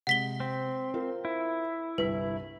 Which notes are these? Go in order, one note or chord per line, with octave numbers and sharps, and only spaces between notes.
C3 G#3 F#5 B6 G7
C4
F4 A#4 C5
E4
G1 C2 B4 B6